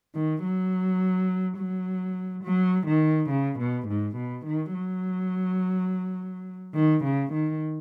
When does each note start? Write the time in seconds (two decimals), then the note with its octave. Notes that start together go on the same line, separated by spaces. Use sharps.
0.15 D#3
0.44 F#3
1.58 F#3
2.44 F#3
2.87 D#3
3.30 C#3
3.59 B2
3.88 G#2
4.16 B2
4.46 D#3
4.74 F#3
6.75 D#3
7.04 C#3
7.33 D#3